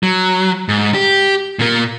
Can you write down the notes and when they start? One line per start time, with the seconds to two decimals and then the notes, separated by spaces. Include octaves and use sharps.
0.03 F#3
0.69 G#2
0.94 G4
1.59 A#2 A#3